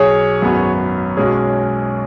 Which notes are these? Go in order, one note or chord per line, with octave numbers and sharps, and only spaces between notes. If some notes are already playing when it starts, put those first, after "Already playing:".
Already playing: B1 B2 F#3 G#4 C#5
G#1 F#2 F#3 B3
B1 B2 G#3 C#4 G#4